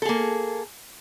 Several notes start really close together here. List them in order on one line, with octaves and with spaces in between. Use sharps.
A4 G#4 A#3